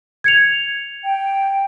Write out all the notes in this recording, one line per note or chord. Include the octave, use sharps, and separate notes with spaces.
G#6 C#7 F7
G5